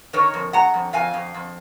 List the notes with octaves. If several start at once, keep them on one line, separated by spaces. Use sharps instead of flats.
D#3 A#4 C#5
F2
G#3 F#5 A#5
F2
F2 F5 G#5
F2
F2